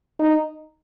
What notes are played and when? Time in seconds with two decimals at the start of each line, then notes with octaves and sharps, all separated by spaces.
0.19 D#4